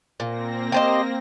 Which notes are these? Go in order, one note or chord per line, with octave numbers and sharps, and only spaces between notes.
A#2 A#3 C4 A#6
G4 C5 D#5